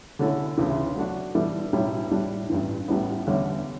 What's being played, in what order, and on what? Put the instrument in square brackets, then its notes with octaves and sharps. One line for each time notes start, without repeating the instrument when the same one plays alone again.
[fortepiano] D3 A3 C#4 E4 A4
D2 C#3 E3
F#3 A3 D4 F#4
E3 G3 D4 A4 E5
B1 A2 G3 C#4 E4
A2 G3 D4 G4
A1 G2 E3
A1 A2 G3 B3
E2 D3 G3 C#4